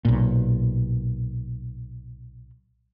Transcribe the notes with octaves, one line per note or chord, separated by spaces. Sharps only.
B1 A#2